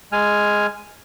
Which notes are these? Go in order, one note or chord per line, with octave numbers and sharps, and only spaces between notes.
G#3 G#5 F6